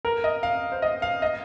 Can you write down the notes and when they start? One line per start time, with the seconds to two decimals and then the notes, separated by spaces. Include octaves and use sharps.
0.05 A#4
0.24 D#5
0.43 F5
0.72 C5
0.82 D#5
1.02 F5
1.22 D#5